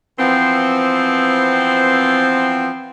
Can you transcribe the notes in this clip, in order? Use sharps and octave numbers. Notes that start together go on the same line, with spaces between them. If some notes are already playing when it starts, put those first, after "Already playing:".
E3 F3 B3 C4